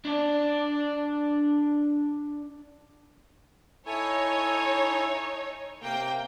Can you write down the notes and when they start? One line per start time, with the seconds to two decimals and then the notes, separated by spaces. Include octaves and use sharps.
0.05 D4 D5
3.86 D#4 E4 A4 C#5 G#5
5.82 C3 A#3 G5